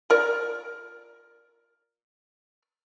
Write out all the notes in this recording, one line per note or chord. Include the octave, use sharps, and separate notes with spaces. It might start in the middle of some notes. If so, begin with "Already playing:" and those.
F4 A#4 D5